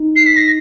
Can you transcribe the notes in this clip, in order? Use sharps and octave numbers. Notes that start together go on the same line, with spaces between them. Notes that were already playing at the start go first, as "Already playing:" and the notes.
Already playing: D#4
C7
B6
A#6